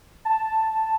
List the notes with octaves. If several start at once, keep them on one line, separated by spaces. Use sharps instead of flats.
A5